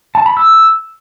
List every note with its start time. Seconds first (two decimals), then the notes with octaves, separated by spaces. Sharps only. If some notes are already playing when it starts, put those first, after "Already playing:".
0.15 A5
0.26 B5
0.37 E6